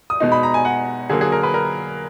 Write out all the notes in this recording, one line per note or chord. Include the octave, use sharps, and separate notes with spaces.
D#6
B2 G#3 D#4
B5
A#5
G#5
F#5
D3 F#3 A#3 G#4
G#4
A#4
B4
A#4